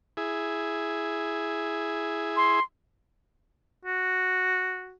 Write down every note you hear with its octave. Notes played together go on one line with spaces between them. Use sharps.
E4 G#4
C6
F#4